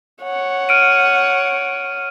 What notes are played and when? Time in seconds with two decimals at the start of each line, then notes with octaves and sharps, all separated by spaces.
0.23 C#5 F#5
0.69 F6 D7 D#7